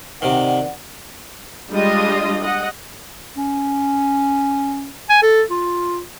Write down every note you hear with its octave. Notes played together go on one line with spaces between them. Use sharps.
C3 D#3 D5 F#5
G3 G#3 D4 F4 D#5
D#5 F#5
C#4
G#5
A4
F4